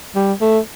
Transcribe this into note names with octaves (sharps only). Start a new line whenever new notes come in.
G3
A3